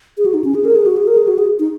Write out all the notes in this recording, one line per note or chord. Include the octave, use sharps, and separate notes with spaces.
G#4
F#4
D#4
C#4
G#4
A#4
G#4
F#4
G#4
A#4
G#4
F#4
G#4
D#4